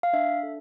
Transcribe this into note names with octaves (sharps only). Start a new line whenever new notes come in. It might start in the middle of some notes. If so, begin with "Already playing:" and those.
F5
D4 E5
A4